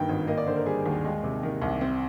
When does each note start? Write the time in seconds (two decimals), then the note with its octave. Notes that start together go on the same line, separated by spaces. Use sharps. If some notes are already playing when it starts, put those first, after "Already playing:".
Already playing: G2 D#3 A#3 G5
0.09 G#1
0.27 A#3 D#5
0.38 D5
0.47 D3 C5
0.56 A#4
0.66 G3 G#4
0.86 D#2
1.04 G#3
1.23 C3
1.43 D#3
1.62 C2
1.81 C4